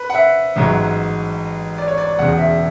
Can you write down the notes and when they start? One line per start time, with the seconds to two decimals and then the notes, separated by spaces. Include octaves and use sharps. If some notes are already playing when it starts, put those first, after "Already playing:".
Already playing: B4
0.10 F#5
0.15 E5
0.56 A1 G#2 F#3
1.78 D5
1.88 C#5
1.98 D5
2.09 D5
2.19 E1 E2 C#3 F#5
2.39 E5